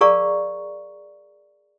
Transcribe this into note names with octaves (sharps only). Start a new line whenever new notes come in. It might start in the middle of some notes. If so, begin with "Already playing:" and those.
G#4 A#4 D5 F5 A#5 C#6